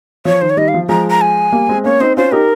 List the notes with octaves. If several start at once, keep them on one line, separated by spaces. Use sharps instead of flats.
F3 C#5
D#3 C5
C#5
D#3 G3 D#5
F5
F3
F3 G#3 A#5
A#5
G#5
G3 A#3
G#3 C4
A#3 C#4 C#5
C4 D#4 C5
C#4 F4 C5
D#4 G4 A#4